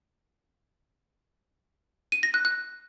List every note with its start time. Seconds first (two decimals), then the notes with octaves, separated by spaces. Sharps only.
2.12 D#7
2.23 A#6
2.34 F#6
2.45 F#6